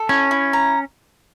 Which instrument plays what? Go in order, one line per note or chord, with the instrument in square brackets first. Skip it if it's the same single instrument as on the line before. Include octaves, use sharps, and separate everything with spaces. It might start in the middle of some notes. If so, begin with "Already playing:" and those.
Already playing: [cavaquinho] A4
[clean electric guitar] C#4 [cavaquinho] E4
[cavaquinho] E4
A#5